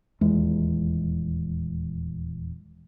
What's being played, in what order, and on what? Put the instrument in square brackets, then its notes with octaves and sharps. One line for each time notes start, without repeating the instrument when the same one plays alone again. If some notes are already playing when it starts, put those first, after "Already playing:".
[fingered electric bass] D#1 E2 G#3